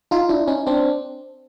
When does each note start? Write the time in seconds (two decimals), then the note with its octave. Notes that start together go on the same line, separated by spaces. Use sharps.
0.11 D#4 F4
0.29 D4 E4
0.48 C#4 D#4
0.67 C4 D4